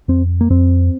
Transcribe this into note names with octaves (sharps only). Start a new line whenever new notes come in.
F2 C4
A#3
F2 C4